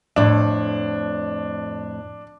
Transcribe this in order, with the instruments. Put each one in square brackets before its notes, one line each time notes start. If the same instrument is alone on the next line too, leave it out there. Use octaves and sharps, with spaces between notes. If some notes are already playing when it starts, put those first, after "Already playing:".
[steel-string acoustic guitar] F2 A2 [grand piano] D4